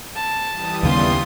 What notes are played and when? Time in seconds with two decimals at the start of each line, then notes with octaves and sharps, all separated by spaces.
0.15 A5
0.52 E3 G3 D#6
0.83 D#2 C#3 B3 F4 C6